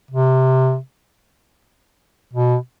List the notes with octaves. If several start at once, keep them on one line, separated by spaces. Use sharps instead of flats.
C3
B2